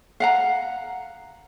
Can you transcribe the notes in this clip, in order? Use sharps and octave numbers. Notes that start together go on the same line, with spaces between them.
F5 F#5 A#5